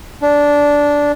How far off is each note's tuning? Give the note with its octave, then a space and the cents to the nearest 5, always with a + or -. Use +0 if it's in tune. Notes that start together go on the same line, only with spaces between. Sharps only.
D4 -10